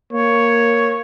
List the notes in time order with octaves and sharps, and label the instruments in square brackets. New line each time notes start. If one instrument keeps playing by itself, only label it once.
[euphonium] A#3 [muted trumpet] C#5